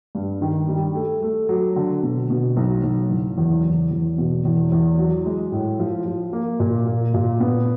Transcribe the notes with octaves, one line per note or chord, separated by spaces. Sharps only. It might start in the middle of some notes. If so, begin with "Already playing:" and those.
G2
D#3
G3
A3
A3
F#3
D3
B2
B2
B1
B1
F#1
E2
E2
E2
B2
E2
E2
F#3
G#3
A2
F3
F3
A#3
A#2
A#3
A#2
B3